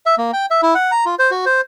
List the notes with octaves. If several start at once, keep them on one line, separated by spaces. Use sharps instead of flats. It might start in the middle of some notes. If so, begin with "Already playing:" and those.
E5
A#3
G5
E5
E4
F#5
A#5
F4
C5
F#4
C5